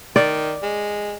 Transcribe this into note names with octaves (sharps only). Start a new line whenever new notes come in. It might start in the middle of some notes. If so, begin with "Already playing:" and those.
D#3 D5
G#3